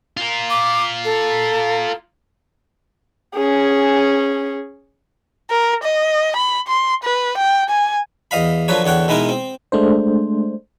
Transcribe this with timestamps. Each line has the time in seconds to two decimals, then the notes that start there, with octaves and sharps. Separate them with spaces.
0.17 F4 A#4
0.50 D6
1.05 A4
3.34 C#4 G#4
5.51 A#4
5.83 D#5
6.36 B5
6.68 C6
7.03 B4
7.38 G5
7.70 G#5
8.31 E2 D#5 F5 B5
8.68 D3 F3 F#3 B4 C#5
8.84 E2 D3 C#5 F#5 G5
9.08 B2 G#3 B3 D#4 E4 A#4
9.29 C4
9.72 G#3 A3 D4 C5